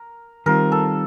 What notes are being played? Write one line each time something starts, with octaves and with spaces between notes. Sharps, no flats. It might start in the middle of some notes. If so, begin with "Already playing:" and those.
Already playing: A#4
D#3 G3 C4 F4 A#4
A4